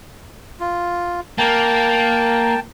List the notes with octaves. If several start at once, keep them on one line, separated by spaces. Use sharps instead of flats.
F4
A#3 G5 A5